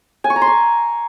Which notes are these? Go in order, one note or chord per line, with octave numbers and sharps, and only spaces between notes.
G#5
C#6
A#5
C6
C#6